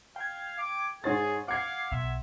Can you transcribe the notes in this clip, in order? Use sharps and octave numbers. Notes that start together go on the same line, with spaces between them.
F5 G5 G#6
D6
G#2 G#4 C#5 A6
F5 F#5 D6 G#6 C7
B1 E5